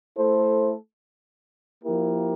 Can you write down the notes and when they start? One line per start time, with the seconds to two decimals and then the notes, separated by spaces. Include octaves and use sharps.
0.15 A3 E4 A4 C5
1.84 F3 A#3 E4 G4 A#4